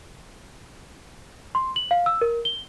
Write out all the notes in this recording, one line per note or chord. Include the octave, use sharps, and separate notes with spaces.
C6
F#7
F5
E6
A#4
G7